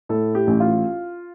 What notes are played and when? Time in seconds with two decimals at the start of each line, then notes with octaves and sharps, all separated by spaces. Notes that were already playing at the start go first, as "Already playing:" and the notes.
0.09 A2 A4
0.35 G4
0.47 A1
0.60 F4